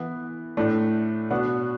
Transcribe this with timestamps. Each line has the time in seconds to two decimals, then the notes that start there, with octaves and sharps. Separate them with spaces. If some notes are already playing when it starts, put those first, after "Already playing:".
Already playing: E3 B3 E4
0.57 A2 A3 D4
1.30 B2 B3 D4